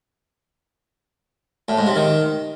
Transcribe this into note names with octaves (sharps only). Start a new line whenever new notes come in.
A2
G#2
C3
D#3